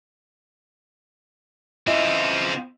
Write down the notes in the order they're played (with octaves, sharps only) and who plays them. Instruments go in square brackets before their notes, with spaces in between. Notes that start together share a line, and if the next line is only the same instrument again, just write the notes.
[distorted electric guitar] C#3 E3 [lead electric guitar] C4 F4 [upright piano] E4 [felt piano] D#5